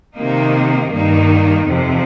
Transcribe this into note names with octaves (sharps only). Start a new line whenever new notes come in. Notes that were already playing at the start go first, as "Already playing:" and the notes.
C3 D#3 A#3 D#4
G2 D#3 A#3 D#4
F2 C3 F3